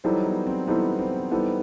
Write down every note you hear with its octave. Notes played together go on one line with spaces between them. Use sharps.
E3 F#3 G3 D#4 A4 C5
B3
C4
E3 G3 B3 D#4 A4 C5
C4
E3 G3 B3 D#4 A4 C5